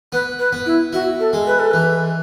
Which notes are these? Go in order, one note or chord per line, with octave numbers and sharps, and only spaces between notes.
B3 B4
B4
B3
E4
E4 F#4
A4
G#3
B4
A4
E3 B4